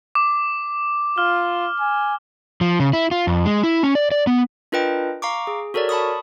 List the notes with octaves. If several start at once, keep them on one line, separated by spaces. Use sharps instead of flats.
D6
F4 F6
G#5
F3
C#3
E4
F4
F2
G#3
E4
C#4
D5
D5
B3
D4 F4 A#4 B4 D#5 G5
F5 A#5 C#6 D6
G#4
F#4 A4 A#4 C#5 D5
A5 B5 C#6 D#6